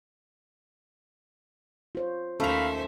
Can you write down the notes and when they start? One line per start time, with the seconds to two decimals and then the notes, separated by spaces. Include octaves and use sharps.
1.95 F4 C5 C#5
2.40 D#2 A3 C#4 C5 E5 F5 A#5 B5